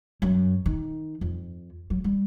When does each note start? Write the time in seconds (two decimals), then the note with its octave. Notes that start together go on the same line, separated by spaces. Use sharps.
0.22 F#2
0.66 D#3
1.21 F2
1.90 F#3
2.04 G3